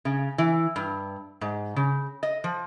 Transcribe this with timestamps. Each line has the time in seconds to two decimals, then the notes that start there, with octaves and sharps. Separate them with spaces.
0.05 C#3
0.38 E3
0.76 G2
1.41 G#2
1.76 C#3
2.23 D#5
2.44 F3